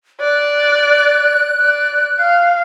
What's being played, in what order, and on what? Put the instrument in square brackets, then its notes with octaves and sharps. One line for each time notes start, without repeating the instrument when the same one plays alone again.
[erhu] D5 [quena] F#6
[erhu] D5
F5